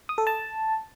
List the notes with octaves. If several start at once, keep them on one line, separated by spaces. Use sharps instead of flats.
D#6
A4
A5